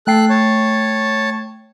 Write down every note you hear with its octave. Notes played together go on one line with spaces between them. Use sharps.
A3 A4 G5 F#6 C7
C#5 A5